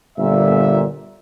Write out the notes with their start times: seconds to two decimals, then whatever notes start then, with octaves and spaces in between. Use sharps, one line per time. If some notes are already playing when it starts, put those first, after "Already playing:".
0.17 G1 A#2 E5